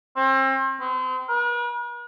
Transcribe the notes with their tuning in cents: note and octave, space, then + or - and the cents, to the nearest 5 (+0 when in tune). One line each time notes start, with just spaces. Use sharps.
C4 +35
C4 -35
B4 -45